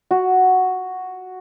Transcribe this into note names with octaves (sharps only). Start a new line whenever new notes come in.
F#4